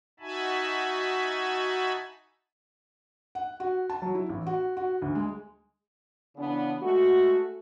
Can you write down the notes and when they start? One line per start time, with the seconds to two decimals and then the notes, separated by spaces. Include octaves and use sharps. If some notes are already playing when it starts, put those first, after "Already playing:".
0.20 D#4 F#4 E5 G#5 A5 B5
3.35 F#5
3.60 F#4
3.90 A5
4.02 F#3
4.15 E4
4.29 A1
4.46 F#4
4.77 F#4
5.02 D2
5.15 G#3
6.37 C#3 E3 B3 C#4 D4
6.81 G#3 A3 F#4